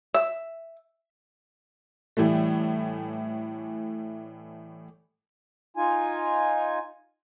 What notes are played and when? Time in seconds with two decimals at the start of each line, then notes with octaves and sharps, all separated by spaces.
0.14 E5
2.17 A2 E3 G3 A3
5.77 D#4 F4 G#5